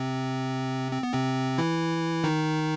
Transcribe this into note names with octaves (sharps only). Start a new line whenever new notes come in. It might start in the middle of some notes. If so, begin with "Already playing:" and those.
Already playing: C3 C4
C4
B3
C3 C4
E3 E4
D#3 D#4